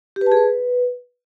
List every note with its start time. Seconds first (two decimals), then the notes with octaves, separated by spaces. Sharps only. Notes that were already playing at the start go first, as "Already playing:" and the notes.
0.16 G4
0.21 B4
0.26 A5
0.32 G#4
0.37 B4